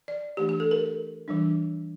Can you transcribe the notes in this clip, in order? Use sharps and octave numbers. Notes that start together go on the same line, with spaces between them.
D5
E3 A3 D4 G4
G4
A4
A#4
E3 G3 D4